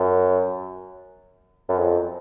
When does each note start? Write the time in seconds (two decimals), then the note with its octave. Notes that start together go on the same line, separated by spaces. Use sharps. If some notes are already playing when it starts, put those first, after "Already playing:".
Already playing: F#2
1.69 F#2
1.78 F2